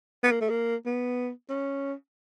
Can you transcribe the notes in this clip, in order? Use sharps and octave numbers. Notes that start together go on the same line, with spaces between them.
B3
A#3
A3
A#3
B3
C#4